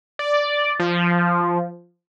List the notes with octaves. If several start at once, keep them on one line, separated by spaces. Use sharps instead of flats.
D5
F3